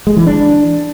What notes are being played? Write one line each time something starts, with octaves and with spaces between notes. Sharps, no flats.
G#3
E3
D4